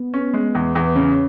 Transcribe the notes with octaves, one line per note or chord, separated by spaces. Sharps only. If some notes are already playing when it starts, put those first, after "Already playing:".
Already playing: B3
C#4
G#3
E2
E2
B3
C#3 C#4